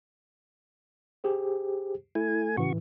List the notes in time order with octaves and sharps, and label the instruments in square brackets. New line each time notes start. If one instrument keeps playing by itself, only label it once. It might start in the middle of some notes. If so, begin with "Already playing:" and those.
[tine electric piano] G4 G#4 C5
[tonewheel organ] A3 G#5 [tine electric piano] E4
[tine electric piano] A2 E3 [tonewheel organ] C#3 F#4 C#6